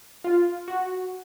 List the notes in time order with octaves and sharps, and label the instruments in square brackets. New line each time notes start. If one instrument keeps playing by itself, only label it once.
[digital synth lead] F4
F#4